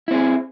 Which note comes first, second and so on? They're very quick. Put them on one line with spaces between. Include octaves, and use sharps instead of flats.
E4 C4 G#4